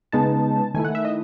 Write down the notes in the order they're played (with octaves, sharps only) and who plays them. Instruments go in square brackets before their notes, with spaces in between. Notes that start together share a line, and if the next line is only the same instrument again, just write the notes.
[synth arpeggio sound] C#3 G#3 B3 D#4 A5
D#3 A3 E4 G#5
F#5
E5
D#5